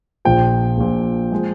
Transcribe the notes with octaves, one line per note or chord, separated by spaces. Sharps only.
A#1 A#2 F3 G5
A#1 A#2 F3
F3 G#3